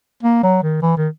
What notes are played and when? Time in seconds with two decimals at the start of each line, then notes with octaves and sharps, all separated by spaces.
0.23 A#3
0.43 F#3
0.63 D#3
0.82 E3
0.97 D#3